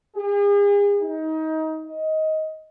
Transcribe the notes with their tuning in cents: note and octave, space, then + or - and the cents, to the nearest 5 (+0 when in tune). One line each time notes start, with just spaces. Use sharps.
G#4 -40
D#4 +25
D#5 +15